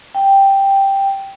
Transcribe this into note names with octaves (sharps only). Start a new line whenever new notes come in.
G5